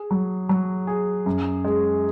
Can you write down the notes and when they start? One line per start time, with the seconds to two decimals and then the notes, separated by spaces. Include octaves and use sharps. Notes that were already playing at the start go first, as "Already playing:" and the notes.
Already playing: G#4
0.11 F#3
0.49 F#3
0.87 G#4
1.26 F#2
1.65 G#3